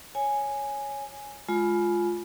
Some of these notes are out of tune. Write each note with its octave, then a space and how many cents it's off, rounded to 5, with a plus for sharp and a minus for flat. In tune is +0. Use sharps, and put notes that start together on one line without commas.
C#5 +0 G#5 +0
G#3 +20 F4 +0 B5 -5